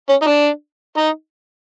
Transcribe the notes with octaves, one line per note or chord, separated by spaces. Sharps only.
C#4
D#4
D4
D#4